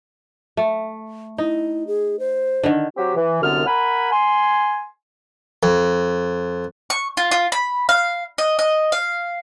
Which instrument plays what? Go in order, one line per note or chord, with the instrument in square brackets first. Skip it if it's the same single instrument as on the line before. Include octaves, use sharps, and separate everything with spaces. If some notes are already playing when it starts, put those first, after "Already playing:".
[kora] A3
[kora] D#4 [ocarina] E4
[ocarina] G#4
C5
[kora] D3 D#3
[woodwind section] F#3 C4 F#4 G4
E3
C2 F#2 D3 B3 D4 F6
A#4 F#5 G#5 B5
G#5 C6
[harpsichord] F2
[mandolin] C#6
F4
F4
B5
F5
D#5
D#5
F5